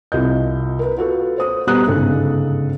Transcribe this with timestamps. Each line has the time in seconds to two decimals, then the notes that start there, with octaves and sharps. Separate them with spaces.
0.12 C2 F4 D#5 G6
0.79 A#4 B4
0.97 F4 F#4 A4 B4
1.38 C5 D#6
1.67 B2 G3 B3 A#5 D#6 F#6
1.87 G1 G#2 C#3 A4